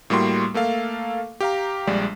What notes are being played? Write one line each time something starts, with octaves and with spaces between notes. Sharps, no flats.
A2 G3 A#3 F#4 C6
A3 A#3 A4 F5
G4 F5 A#5
A#1 G3 G#3 D5